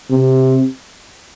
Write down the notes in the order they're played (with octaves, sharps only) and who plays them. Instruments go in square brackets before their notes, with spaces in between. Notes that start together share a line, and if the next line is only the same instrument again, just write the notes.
[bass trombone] C3